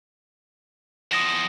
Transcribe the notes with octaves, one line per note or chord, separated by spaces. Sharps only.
E2 F3 D#6 A#6 E7